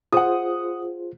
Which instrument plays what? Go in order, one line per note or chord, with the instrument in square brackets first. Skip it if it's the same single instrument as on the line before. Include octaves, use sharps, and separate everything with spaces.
[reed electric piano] F4 G#4 C5 [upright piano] F#5 D#6